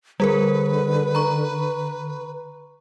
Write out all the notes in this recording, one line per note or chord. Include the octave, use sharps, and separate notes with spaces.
D3 G3 G#4 A#4 B4
A#5 C#6